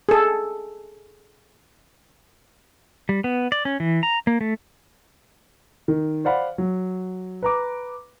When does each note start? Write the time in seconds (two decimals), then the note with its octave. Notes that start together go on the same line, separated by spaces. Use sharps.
0.09 G#4 A4
3.09 G3
3.24 B3
3.52 D5
3.65 C#4
3.80 E3
4.03 A#5
4.27 A#3
4.41 A3
5.88 D#3
6.25 C5 D5 F5 F#5 B5
6.58 F#3
7.42 B4 A#5 D6